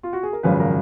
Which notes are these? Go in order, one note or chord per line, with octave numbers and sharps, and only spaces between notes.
F4
F#4
G#4
A#4
G#1 F#2 C#3 F3 B4
A#4